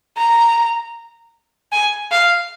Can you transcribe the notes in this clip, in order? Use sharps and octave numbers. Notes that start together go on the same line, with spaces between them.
A#5
G#5
F5